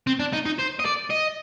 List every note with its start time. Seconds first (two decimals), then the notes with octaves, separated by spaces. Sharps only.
0.07 C4
0.20 D4
0.33 D#4
0.46 D#4
0.59 C5
0.80 D#5
0.86 D5
1.11 D#5